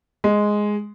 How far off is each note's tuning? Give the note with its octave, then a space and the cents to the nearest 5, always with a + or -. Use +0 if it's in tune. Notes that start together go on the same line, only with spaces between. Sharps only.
G#3 +0